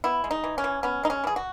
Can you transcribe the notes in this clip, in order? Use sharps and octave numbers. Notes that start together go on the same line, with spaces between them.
B3 E4
G#3
D#4
E3
C#4
E3
B3 C#4
G#3 D#4
C#4
E3 G#4
F#4